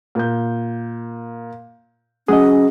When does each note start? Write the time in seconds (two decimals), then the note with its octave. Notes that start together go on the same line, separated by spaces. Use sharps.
0.15 A#2 G6
2.28 F#3 C#4 G#4 D#5 F#5 D#6